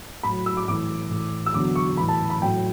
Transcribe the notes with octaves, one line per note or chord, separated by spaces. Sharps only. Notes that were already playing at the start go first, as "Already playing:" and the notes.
A2 F#3 B5
E6
D6
A2 E3 D6
A2 E3
E6
E2 D3 F#3 D6
C#6
A2 E3 B5
A5
B5
A2 F#3 G5